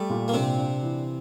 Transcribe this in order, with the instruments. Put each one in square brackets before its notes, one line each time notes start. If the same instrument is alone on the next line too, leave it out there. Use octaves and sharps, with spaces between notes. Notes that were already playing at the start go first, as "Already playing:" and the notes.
Already playing: [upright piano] G3 [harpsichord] A3
[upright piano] A#2
[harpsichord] A#3
[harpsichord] C3 C4 [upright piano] D4
[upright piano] D4
E3